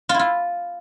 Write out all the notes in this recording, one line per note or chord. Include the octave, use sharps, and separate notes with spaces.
F4
E4
F4